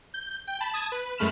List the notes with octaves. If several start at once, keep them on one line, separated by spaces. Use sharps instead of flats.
G6
G5 G6
A5 B5
A5 D#6 G#6
B4
F#2 G#3 A3 B5 F6 E7